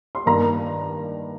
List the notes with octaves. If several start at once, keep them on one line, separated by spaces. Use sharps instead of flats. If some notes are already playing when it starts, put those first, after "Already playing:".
C6
G2 D#3 A#3 A#5